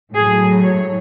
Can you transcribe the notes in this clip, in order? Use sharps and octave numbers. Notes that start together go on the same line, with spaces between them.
A2 F#3 G#4
C#5